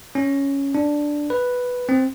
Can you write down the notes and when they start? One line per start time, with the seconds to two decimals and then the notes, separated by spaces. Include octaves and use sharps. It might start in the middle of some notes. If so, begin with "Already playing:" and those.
0.15 C#4
0.75 D4
1.30 B4
1.89 C4